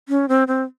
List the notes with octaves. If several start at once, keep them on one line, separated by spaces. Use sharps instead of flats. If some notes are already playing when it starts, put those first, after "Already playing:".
C#4
C4
C4